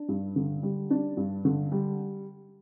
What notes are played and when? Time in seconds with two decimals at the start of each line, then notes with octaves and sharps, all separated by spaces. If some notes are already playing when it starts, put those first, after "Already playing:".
Already playing: D4
0.08 G2
0.36 D3
0.63 G3
0.90 D4
1.17 G2
1.45 D3
1.72 G3